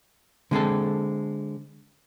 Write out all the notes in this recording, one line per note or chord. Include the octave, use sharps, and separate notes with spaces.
D3 G#3 C4 A4